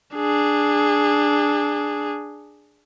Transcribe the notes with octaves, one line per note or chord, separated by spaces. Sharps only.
D4 G#4